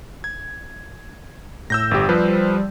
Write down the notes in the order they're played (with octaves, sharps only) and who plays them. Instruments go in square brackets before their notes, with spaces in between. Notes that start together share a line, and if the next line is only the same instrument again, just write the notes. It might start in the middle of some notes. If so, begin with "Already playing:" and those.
[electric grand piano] G#6
[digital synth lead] A2 [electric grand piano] E6 G6 A#6
[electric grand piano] G1 G4
[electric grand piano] F3 B4 C5 [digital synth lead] G3